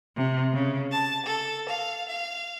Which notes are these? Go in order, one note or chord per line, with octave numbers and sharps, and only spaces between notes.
C3
C#3
A5
A4
F5
F5